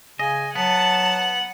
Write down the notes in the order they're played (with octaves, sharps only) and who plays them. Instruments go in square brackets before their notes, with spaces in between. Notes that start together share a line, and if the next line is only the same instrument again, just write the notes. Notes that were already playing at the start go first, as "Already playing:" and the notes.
[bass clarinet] C#3 [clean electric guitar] D#5 [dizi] G#5
[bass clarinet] F#3 [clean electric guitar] B3 [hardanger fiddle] F#5 [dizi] A5